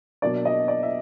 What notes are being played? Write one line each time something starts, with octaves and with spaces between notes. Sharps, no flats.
B2 F#3 A#3 D4 D5
D#5
D5
E5